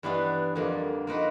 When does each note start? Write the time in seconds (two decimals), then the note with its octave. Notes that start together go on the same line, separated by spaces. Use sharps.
0.03 G2 E3 G3 B3 D4
0.55 F2 D3 G3 A#3
1.07 F3 A#3 D#4 F#4 B4